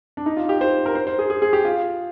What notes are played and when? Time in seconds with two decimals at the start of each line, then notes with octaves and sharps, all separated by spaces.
0.17 D4
0.26 D#4
0.37 F4
0.49 G4
0.61 C5
0.86 A#4
0.95 C5
1.07 C5
1.19 G#4
1.30 G#4
1.42 G#4
1.53 G4
1.65 F4